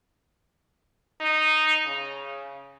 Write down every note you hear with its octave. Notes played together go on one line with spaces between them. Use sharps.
D#4
C#3